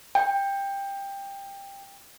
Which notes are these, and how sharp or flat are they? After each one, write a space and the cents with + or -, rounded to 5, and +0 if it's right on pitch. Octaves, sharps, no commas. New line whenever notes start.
G5 +15